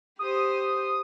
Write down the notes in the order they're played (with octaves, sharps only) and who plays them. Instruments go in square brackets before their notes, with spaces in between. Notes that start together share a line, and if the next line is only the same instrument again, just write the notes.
[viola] G4 C5 [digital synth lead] D#6